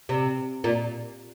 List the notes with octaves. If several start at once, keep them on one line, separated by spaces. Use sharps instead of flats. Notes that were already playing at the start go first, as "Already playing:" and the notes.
C3
A#2